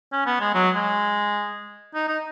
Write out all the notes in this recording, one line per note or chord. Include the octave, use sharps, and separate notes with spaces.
C#4
B3
G#3
F#3
G#3
D#4
D#4